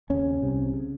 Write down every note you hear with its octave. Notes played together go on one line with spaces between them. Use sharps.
D#2 C#3 C#4
C2 C3
C#3